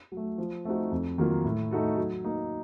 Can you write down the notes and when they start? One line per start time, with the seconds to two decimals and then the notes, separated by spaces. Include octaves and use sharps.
0.12 F#3
0.17 A3
0.38 F3
0.65 A3 C4 D#4 F#4
0.91 F2
1.18 D#3 F#3 A#3 F4
1.45 A2
1.71 A3 D#4 F#4 A4
1.97 F#3
2.25 A#3 D#4